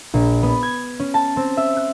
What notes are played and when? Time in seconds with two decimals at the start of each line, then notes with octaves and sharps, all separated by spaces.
0.14 A#1
0.43 B3
0.63 G#6
1.00 C#4
1.14 A5
1.37 C4
1.57 E5
1.77 F#6